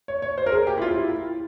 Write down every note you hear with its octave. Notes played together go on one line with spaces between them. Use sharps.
C#5
C#5
C5
A#4
G#4
G4
E4
F4
E4